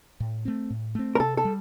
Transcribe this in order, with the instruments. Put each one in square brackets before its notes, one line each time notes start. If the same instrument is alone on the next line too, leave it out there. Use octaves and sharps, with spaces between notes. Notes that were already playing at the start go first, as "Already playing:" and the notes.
[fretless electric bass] A2
A3 C4
A2
A3 C4
[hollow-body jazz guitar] A#4
[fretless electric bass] C3 [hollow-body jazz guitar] A4
[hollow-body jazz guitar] A4
[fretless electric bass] G3